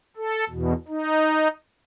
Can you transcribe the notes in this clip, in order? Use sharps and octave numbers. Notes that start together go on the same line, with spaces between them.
A4
E2 B2
D#4